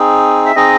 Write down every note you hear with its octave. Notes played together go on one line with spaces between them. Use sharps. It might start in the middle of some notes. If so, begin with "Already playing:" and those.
Already playing: C4 D#4 G#4
E5
C4 D#4 G#4 D#5